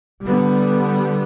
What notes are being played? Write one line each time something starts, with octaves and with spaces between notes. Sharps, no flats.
D3 G3 B3